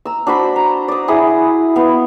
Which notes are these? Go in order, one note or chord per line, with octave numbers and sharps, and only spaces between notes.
A#5 E6
D4 F#4 C5 B5
A#5
D5 D#6
E4 G#4 B5 D#6
B3 F5